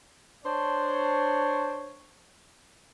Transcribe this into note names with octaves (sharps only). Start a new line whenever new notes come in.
D4 C5 C#5